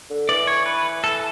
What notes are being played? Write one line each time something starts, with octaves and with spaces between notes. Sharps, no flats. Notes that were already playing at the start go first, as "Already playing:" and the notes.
D3
E3 D5
C#5
B4
A4